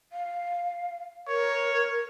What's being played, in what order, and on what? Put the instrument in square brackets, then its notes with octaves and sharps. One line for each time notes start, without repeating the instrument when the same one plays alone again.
[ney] F5
[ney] A#4 [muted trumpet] C#5